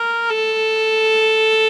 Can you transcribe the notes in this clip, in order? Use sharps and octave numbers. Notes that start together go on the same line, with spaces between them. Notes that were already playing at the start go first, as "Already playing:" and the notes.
Already playing: A#4
A4